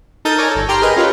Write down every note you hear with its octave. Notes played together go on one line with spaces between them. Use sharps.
D#4 A4 A#4 G6 A6 D#7
A#4 C#5 D5 G#5 A#5
G1 A4
G4 G5 A#5 C6 F6
G#4 A#4 B4 D#5
C#4 F4 G4 A#4 B4